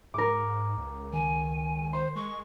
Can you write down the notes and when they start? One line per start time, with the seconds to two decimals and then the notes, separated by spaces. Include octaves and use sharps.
0.14 G#2 A#4 D6
0.77 C#2
1.13 D#3 G#5
1.93 C5 C6
2.16 G#3 C#6